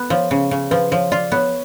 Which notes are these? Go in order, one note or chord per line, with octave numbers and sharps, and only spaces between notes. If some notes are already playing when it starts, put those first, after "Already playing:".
Already playing: B3
F3 C#5
C#3
C#3
F3 B4
F3 C#5
F4 D5
B3 C#5